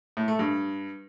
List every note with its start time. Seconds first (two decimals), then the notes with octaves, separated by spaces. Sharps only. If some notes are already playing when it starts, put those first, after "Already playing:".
0.17 A2
0.28 A3
0.39 G2